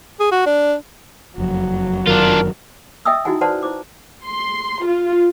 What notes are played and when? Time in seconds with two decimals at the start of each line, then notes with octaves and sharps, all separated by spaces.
0.20 G#4
0.31 F#4
0.46 D4
1.38 F#1 F2 F#3
2.07 G1 F#2 D#3 D4 F4 A#4
3.05 D#5 E5 G5 G#5 D#6 E6
3.25 D#4 E4 F#4 G#4 F#5 G#5
3.41 B4 C5 D5 F#5 A5 C6
3.63 E4 C5 C#6 D6
4.26 C6
4.86 F4